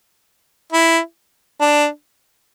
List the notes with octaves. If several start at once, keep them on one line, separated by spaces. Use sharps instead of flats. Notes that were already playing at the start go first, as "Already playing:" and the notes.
E4
D4